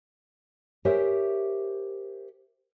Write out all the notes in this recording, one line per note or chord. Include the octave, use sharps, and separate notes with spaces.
G4 A#4 C5 C#5 E5 G#5